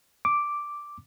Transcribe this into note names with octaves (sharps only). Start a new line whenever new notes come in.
D6